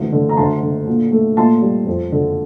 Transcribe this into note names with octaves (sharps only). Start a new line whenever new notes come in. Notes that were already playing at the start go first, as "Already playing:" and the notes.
Already playing: D2 E3
D3
A#5
D2 A5 C6
D3
A#2
A3
A#2 A5 C6
G3
F2
D3